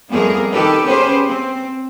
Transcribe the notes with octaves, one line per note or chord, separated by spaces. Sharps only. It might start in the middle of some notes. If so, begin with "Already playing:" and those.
F2 G3 A3 B3 G#4 A#4
D#3 G4 A4 B4
B3 C#4 G4 G#4 B4 C5
C4